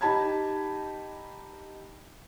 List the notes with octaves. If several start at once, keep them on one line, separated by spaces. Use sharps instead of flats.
D#4 G4 A5 B5 G#6